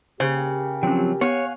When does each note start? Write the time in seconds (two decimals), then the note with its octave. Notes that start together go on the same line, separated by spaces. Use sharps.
0.20 C#3 A#3 G4 C5
0.83 F3 F#3 C4 C#4 G5
1.21 B3 C#5 F5 F#5 G#5